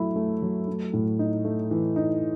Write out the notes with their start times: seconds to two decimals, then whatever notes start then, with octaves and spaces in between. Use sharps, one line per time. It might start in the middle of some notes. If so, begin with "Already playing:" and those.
Already playing: F#3 A3 E4
0.16 A3
0.42 F#3
0.68 A3
0.93 A2
1.19 D#4
1.45 A3
1.71 E3
1.96 D#4